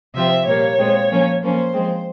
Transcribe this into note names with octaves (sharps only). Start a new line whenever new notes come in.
C3 F3 C4 E5
A#2 G3 A#3 C#5
A#2 G#3 C4
F3 A#3 C#4
F3 A#3 C#4 C5
F3 G#3 C4